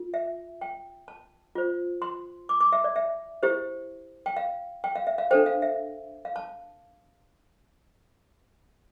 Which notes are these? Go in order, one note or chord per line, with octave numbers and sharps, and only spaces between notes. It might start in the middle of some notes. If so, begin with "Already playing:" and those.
Already playing: F4
E5
G5
A5
F4 C5
C6
D6
D6
E5
D5
E5
E4 G4 C5
G5
F5
G5
F5
E5
F5
D4 A4 C5 G5
F5
E5
F5
A5